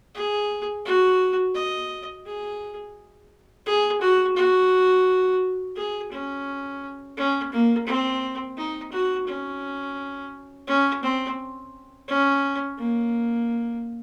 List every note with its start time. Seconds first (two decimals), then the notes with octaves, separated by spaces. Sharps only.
0.14 G#4
0.85 F#4
1.55 D#5
2.26 G#4
3.66 G#4
4.01 F#4
4.36 F#4
5.76 G#4
6.12 C#4
7.17 C#4
7.52 A#3
7.87 C4
8.57 D#4
8.92 F#4
9.27 C#4
10.68 C#4
11.03 C4
12.08 C#4
12.78 A#3